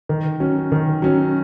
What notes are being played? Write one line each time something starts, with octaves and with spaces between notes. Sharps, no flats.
D#3
F#3 C#4
D#3
F#3 C#4